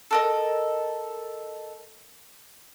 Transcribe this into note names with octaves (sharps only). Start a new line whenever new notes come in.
A4 A#4 D#5